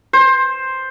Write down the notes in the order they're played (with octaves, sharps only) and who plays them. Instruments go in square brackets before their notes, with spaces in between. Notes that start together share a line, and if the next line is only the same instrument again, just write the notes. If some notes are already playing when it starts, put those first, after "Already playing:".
[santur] C5